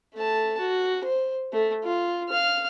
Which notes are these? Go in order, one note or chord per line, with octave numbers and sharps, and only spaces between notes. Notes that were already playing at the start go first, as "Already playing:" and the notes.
A3 A5
F#4
C5
A3
F4
F5 F6